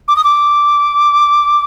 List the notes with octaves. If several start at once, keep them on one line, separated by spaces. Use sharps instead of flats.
D6
D#6
D6